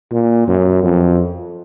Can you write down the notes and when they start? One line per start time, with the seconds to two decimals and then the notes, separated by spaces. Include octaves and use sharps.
0.12 A#2
0.48 F#2
0.83 F2